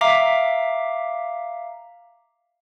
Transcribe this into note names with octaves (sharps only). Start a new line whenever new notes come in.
E5 F5 A#5 D6 B6